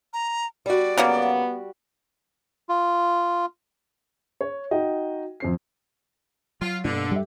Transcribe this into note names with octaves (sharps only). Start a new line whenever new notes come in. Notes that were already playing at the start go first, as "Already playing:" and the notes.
A#5
G3 F#4 D5
C#3 F#3 A#3 B3
F4
C#5
D#4 F#4 D#5 G5
F2 C4 C7
F#3 F4
G2 B2 D3 A#3
G3 G4 A4 E5